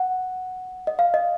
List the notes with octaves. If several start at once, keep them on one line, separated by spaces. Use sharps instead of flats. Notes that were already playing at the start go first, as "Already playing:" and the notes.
Already playing: F#5
D#5
F5
D#5